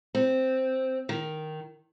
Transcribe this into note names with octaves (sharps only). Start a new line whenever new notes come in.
C4
D#3